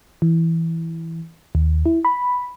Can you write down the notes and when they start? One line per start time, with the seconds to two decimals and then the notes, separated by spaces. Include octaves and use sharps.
0.22 E3
1.55 D#2
1.86 E4
2.05 B5